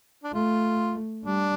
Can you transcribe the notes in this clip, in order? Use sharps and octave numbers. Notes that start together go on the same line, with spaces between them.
D4
A3 F4
G3 D4